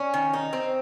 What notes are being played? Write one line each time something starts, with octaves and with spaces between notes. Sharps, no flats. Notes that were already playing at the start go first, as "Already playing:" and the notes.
Already playing: C#4
D#3
D#4
C4